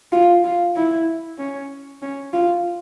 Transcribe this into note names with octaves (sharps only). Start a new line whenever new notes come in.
F4
F4
E4
C#4
C#4
F4